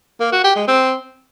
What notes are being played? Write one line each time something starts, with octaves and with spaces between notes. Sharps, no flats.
A#3
F#4
G4
G#3
C4